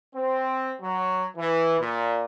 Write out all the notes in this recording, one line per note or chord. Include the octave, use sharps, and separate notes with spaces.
C4
F#3
E3
A#2